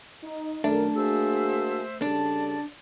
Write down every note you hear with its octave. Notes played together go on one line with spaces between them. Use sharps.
D#4
F#2 D#3 A3 D4 A#4
A#3 F#4 G#4 C5 E5 E6
C#3 G3 D4 A4 D5 A5